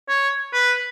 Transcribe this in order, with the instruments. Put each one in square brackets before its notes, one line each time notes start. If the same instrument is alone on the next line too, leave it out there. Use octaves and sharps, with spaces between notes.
[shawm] C#5
B4